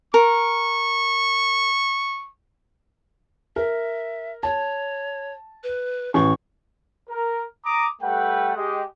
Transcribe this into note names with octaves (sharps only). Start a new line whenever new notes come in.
A#4 C#6
A#4 E5
C#5 A5
B4
A1 C#6
A#4
A#5 D6 D#6
G3 A3 A4 B4 F#5 G5
G#3 G4 D#5